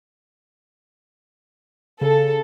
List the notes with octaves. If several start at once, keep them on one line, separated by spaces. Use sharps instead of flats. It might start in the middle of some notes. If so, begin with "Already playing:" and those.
C#3 A4